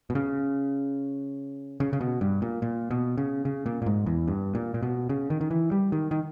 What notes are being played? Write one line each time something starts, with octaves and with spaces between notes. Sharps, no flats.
B2
C#3
C#3
C#3
B2
G2
A#2
A#2
B2
C#3
C#3
A#2
A#2
G#2
E2
G2
A#2
A#2
B2
C#3
D#3
D#3
E3
G3
D#3
D#3